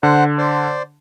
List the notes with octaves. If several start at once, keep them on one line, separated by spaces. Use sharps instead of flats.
D3 C5 F#5
C5 D5